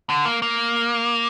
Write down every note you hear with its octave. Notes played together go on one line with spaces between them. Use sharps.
D3
A#3
A#3